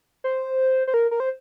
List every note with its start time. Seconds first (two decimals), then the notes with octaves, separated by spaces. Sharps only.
0.24 C5
0.87 C5
0.94 A#4
1.11 A#4
1.20 C5